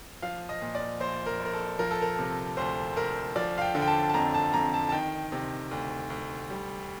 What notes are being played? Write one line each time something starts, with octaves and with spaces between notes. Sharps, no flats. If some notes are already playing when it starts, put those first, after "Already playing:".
F3 F5
D#5
A#2
D5
A#1 C5
A#4
A#1
A#4
A4
F3 A#4
A4
A#4
C3
D2 C5
D2 A#4
F3 D5
F5
G5
D3
G5
A5
A5
F2 A#5
A5
F2 A#5
A5
A5
D#3 G5
C3
D2
D2
G3